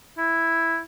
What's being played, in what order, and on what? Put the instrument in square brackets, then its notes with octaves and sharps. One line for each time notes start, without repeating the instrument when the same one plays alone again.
[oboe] E4